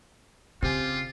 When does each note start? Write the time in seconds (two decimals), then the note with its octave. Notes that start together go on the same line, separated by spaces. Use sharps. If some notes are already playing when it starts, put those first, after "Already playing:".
0.62 C#3 C4 F4 G4 G#5